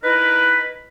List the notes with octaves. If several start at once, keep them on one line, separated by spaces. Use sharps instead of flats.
D#4 E4 A#4 B4